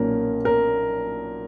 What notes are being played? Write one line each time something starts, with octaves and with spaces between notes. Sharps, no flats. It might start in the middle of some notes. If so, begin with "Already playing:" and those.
Already playing: B1 A#2 A#3 C#4 A#4
A#4